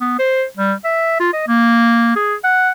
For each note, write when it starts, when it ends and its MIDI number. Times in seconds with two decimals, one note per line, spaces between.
0.01 0.18 59
0.19 0.44 72
0.57 0.74 55
0.84 1.16 76
1.20 1.31 65
1.33 1.44 75
1.47 2.16 58
2.16 2.35 68
2.44 2.70 78